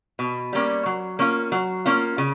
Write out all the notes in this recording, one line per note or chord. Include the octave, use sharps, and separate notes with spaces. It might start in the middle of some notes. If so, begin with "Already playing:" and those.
B2
G3 A#3 C#4
F#3
A#3 C#4 F4
F#3
A#3 C#4 F4
C#3